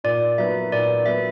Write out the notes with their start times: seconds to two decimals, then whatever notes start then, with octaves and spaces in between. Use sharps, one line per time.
0.04 A#2 D5
0.38 F#3 B3 E5
0.72 A#2 D5
1.06 F#3 B3 E5